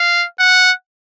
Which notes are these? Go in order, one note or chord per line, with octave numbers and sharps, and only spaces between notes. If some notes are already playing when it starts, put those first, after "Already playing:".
Already playing: F5
F#5